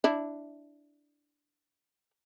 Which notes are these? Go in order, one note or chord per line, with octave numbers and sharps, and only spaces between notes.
D4 E4